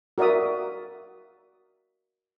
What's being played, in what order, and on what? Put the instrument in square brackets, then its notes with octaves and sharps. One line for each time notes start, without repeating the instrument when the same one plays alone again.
[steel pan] F#4 A#4 D5 E5 D#6